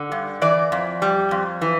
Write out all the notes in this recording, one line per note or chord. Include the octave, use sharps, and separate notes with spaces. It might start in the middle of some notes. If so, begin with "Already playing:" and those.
Already playing: D3
G2
E3 D5
F2
G3
F2
E3